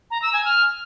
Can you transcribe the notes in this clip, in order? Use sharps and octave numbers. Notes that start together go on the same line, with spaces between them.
A#5
E6
G#5
F6